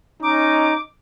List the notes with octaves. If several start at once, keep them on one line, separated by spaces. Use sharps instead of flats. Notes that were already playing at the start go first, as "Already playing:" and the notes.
C#4 D#4 D6